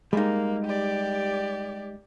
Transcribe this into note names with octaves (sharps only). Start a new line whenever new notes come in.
G3 G#3 A#3 D#4
G4 D5